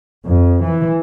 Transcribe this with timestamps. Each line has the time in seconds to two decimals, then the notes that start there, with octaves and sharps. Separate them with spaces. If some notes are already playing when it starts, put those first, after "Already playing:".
0.25 F2
0.63 E3